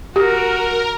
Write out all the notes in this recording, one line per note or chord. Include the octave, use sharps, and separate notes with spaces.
F#4 G4 A#4